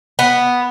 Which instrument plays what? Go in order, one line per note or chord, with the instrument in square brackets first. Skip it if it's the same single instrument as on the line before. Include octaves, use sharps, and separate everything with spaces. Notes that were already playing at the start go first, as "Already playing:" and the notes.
[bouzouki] B3